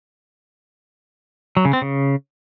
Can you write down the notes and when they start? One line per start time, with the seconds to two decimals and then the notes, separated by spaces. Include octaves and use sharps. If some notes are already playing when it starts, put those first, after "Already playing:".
1.57 F#3
1.65 C#3
1.73 C4
1.82 C#3